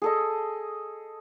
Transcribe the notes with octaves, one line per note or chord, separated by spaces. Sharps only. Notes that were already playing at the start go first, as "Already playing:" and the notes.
G#4 A4 D#5